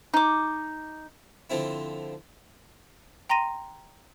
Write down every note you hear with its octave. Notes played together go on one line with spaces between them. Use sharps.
D#4 D6
D3 F3 C4 E4
G5 A#5 C6 A#6 D#7